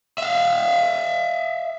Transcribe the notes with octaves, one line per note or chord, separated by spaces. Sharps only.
E5 F5